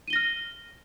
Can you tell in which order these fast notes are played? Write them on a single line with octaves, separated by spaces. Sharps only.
D#7 G7 A#6 F6